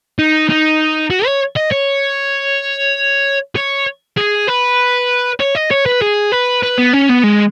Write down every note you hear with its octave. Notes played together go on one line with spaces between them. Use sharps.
D#4
D#4
F#4
C#5
D#5
C#5
C#5
G#4
B4
C#5
D#5
C#5
B4
G#4
B4
B4
B3
C#4
B3
G#3